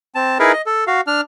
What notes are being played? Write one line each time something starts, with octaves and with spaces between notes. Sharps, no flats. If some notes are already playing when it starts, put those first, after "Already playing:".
C4 A5
D#4 E4 G#4 A#4 B4
D#5
A4
F#4 F5
D4 F6